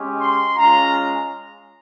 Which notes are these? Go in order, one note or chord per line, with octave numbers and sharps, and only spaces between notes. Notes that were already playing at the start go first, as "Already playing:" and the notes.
Already playing: G#3 C#4 G4
C6
G#3 C#4 F4 A#5